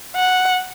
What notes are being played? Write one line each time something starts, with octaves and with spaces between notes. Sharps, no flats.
F#5